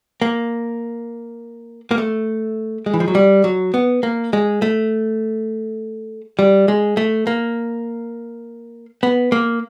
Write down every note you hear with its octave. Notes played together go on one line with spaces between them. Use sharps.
A#3
A#3
A3
G#3
E3
F3
F#3
G3
F#3
B3
A#3
G#3
A3
G3
G#3
A3
A#3
B3
A#3